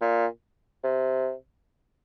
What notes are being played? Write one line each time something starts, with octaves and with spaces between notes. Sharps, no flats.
A#2
C3